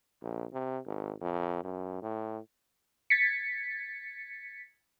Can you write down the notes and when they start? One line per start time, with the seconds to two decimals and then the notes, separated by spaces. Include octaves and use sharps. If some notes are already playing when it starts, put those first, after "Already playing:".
0.22 A#1
0.53 C3
0.86 G#1
1.21 F2
1.64 F#2
2.02 A2
3.10 G#6 A6 B6 C#7